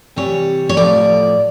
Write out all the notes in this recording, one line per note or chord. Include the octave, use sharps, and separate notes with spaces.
C3 E3 G3 C#5
C#5
A2 F3 D5